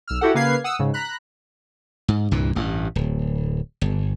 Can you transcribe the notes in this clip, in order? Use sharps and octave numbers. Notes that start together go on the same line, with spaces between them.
B1 E6 F6
E4 F#4 G4 A4 F#5
C#3 A#3 B4 F5 G#6 C7
F#5 D#6 E6
G#2 C#3
A#5 B5 F#6
G#2
C2 G2 A#2 E3
A1 G2
D1
G1